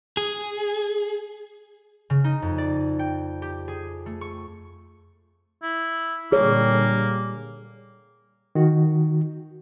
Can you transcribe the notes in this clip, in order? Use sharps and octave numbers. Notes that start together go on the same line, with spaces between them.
G#4
C#3
D#4
F2
D5
G5
G4
G#4
A3
C#6
E4
A#2 D3 G3 A#3 G#4 C#5
D#3 F#4